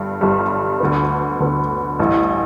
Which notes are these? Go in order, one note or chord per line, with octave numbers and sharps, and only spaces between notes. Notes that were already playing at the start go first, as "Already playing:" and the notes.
Already playing: G1 G2 G3
G1 G2 G3
D2 D3 B3
D2 D3 B3
A1 G2 E3